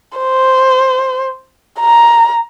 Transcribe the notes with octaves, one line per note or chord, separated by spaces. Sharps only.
C5
A#5